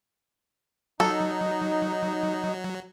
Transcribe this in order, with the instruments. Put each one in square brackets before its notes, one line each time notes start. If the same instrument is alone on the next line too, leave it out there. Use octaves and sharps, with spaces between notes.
[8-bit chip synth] F#3 [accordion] D#4 [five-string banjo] A4